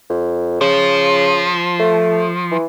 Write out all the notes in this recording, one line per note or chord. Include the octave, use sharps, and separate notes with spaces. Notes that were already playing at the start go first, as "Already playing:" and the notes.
F2
C#3 F3
A3
E3